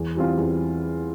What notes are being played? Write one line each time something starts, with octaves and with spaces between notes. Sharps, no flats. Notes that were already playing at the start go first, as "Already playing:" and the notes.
Already playing: E2
E3 G3 C4 F4
E2